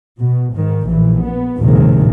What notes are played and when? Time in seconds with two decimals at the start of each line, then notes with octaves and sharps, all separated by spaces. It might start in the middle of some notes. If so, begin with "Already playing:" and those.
0.19 B2
0.54 G#2 D#3
0.86 A#1 A#2 E3
1.22 B3
1.59 A#1 D#2 A2 C3 D#3 G#3